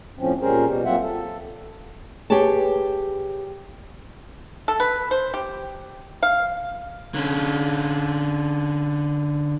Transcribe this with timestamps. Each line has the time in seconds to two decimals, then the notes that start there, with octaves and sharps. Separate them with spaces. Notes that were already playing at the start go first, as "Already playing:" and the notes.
0.19 F2 A2 F3 C4 C#4
0.42 A#2 G3 C#4 G#4 A#4 C5
0.65 B2 G3
0.85 F#3 A#3 C4 F4 E5 F#5
1.02 A4
2.30 G4 G#4 B4 C#5 A5
4.68 A4
4.80 B4
5.11 C5
5.34 G4
6.23 F5
7.15 D3 C#4